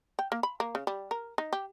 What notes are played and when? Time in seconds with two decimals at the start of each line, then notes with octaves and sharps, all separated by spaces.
0.19 G5
0.32 A#3
0.43 B5
0.60 A#3
0.75 C#3
0.87 G3
1.11 A#4
1.38 D#4
1.53 G4